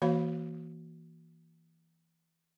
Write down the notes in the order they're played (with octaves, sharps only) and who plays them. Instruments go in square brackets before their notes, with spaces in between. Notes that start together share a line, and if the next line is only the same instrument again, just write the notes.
[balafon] E3 A#3 F#4 C#5 F5 B5